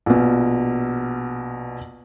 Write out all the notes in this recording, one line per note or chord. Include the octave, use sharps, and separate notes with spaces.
A#1 B2